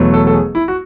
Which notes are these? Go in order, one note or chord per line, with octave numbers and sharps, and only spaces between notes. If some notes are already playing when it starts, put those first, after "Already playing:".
Already playing: E1 E2 B2 F#3 A3
A4
A4
G#4
E4
F#4